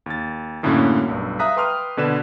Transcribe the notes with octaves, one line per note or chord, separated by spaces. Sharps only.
D#2 A6
F#2 A2 D3 A#3 C#4 F#4
B1 G2
E5 F5 A#5 D#6 F#6 B6
B4 G5 C6 D6 D#6 F6
B2 D3 B4 D5 E7